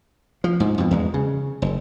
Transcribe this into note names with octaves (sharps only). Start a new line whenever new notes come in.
F3
G#2
F2 B2
E2 G#3
C#3
F#1